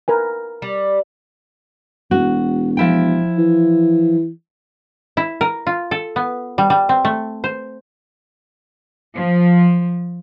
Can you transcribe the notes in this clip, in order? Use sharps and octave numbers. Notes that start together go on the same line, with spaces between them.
A#4 B4 G#5
G3
E1 F#4
F3 E4 G5
E3
E4
A#4
F4
A4
B3
G3
G3
C4
A3
C5
F3